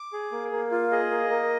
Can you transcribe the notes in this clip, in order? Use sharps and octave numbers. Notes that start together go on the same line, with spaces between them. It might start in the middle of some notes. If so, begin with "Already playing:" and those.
Already playing: D6
G#4
A#3
A#3
F4
G#4 D#5
A#3
A#3